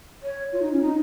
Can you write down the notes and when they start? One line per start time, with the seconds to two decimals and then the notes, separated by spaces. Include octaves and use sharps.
0.23 C#5
0.53 F4
0.62 D#4
0.72 C#4
0.82 D#4